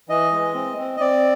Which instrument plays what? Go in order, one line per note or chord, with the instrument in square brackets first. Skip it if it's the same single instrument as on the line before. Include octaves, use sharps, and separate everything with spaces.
[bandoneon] E3 D#5
G#3
C4
C4
D#5
C4 D5